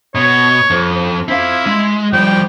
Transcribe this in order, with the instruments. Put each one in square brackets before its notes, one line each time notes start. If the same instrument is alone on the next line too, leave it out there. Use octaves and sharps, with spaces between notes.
[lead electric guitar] B2 [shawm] C#5
[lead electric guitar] F2
[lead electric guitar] C4 F5 [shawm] E4
[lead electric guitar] G#3
[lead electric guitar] F3 G3 [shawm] G5